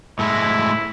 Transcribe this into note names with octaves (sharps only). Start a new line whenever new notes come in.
A2 G#3 E4